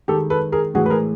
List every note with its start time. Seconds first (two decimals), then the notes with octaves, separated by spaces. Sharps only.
0.08 D#3 G#3 G4 A4
0.30 A4 B4
0.52 G#4 A#4
0.74 A2 E3 G#3 F#4 G#4
0.86 B4
0.90 G#4 A#4